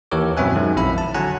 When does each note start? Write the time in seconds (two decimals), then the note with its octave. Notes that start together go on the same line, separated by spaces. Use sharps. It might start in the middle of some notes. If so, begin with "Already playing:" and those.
0.11 D#2 E3 G4 A#4 C#5 D6
0.37 F#2 B2 C4 E5 G#5 F#6
0.56 D#3 F#3 G#3
0.76 A#1 F2 E4 E5 B5
0.98 A5
1.15 D3 F#3 F#5 G#5 A#5 F#6